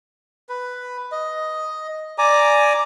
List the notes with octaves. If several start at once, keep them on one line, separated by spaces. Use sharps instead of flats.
B4
D#5
D5 G#5 A#5 D6